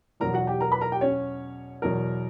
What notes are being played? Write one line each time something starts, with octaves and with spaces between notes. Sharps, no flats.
E2 B2 F#3 A#4 A#5
F#4 F#5
G4 G5
A#4 A#5
B4 B5
A#4 A#5
G4 G5
C#4 C#5
E2 B2 F#3 A#4